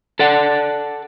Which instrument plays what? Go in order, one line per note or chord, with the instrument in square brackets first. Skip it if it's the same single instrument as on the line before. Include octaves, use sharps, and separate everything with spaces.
[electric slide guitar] A4 D5 F#5